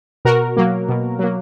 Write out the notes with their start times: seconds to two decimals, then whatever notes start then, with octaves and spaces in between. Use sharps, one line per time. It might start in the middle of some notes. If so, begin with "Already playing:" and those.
0.25 B2 F#4 A#4
0.57 F#3 A#3
0.89 B2
1.19 F#3 A#3